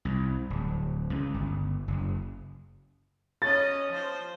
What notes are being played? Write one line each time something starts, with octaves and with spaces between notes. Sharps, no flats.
C2
D1
C#2
G1
F#1
C#4 D#5 A6
F3 C5